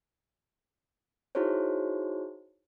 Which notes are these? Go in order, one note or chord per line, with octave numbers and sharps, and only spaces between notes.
D#4 E4 F#4 G#4 C5 C#5